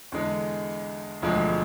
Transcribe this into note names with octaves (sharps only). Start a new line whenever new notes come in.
E2 D3 G#3
E1 D2 D3 F3 G#3